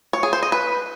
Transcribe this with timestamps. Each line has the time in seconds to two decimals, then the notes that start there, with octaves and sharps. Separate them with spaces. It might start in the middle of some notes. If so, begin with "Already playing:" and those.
0.13 C#5
0.23 G#4
0.33 C5
0.43 D#5
0.52 B4